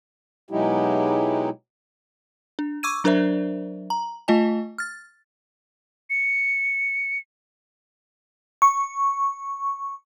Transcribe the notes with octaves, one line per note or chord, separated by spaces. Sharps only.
B2 F#3 G#3 D#4 E4 G4
D4
C#6 D6 E6 G#6 D#7
F#3 D4 A#4 C5 D5 E5
A#5
A3 F4 D#5 G#5 A5
F6 A6
C#7
C#6